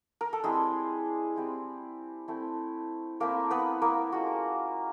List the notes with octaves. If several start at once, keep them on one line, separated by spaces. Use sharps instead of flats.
A#4
A4
G3 G#3 C4 E4 G#4
G3 C4 E4
A3 C4 E4
A3 A#3 C4 E4 A#4
B3 B4
A#3 A#4
G#3 C#4 F4 F#4